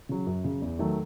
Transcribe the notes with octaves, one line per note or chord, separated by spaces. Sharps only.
C#3 F#3
F#2
C#3 F#3
E2
D#3 F#3 A3